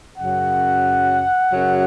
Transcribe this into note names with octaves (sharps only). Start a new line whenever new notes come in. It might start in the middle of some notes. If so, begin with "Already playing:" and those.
F#2 C#3 F#3 F#5
F#2 C#3 F#3